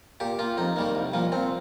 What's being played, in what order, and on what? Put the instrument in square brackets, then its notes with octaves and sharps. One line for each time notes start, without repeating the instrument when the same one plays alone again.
[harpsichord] A#2 G4
A#3 F4
F2 D#4
D#3 G3 A#3
C2
A#2 F3 A#3
A#2 C4